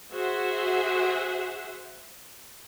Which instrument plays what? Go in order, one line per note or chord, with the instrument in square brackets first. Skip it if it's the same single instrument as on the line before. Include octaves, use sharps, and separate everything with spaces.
[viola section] F#4 G#4 C5 E5 F#5